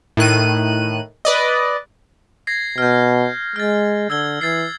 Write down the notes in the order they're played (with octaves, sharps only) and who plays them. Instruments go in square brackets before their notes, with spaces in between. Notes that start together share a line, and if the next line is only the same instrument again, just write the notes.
[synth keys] A2 D#3 F#6 D#7
B4 D5 D#5
[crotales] G#6 A#6 C7
[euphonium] B2 [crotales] F6 G6
[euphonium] G#3 [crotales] F6 A6
[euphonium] D3 [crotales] E6 G#6 G7
[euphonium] E3 [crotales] G#6 A6 C7